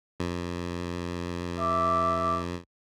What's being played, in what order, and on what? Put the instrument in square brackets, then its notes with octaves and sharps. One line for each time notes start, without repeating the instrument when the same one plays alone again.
[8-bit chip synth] F2
[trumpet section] E5 D6